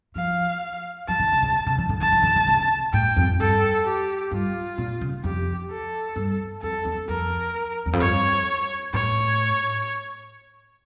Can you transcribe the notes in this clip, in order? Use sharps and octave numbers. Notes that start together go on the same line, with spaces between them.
F3 F5
F3 A5
D3
C#3
C#3
C#3
E3
D3
E3 A5
E3
D3
D3
C#3
A2 G5
F2
G2 A4
G4
G2 F4
A#2
C#3
F2 G4
A4
G2
F2 A4
E2
F2 A#4
E2
F2
G2 C#5
A2 C#5